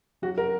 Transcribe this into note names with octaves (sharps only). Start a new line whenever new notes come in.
F#3 F#4
A#4